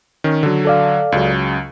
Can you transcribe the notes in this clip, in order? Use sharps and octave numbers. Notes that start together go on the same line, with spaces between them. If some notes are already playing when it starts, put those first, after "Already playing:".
D#3 C#4
D3 F#3
A4 D5 F5
C#2 C#3 F#3